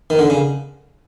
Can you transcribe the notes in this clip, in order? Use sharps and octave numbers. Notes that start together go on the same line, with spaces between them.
D#3
D3
C#3